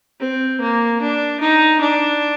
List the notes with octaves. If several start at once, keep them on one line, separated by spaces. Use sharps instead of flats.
C4
A#3
D4
D#4
D4